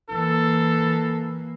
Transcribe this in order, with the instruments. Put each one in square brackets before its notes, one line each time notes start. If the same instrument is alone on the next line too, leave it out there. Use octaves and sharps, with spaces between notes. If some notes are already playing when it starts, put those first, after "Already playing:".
[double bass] E3 A#3 [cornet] A4